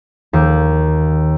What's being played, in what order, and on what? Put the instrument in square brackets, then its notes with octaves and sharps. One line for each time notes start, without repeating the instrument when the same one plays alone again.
[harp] D#2